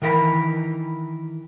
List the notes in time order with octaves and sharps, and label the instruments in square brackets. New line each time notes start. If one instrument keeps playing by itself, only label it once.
[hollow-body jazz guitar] D#3 E3 A#4 E5 B5